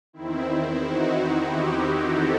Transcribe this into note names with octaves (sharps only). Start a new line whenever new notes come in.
E2 D#3 C4 E4
D#4 F#4
E4 G4
F#4 A4